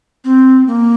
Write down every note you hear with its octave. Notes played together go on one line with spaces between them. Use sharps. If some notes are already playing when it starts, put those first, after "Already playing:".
C4
A#3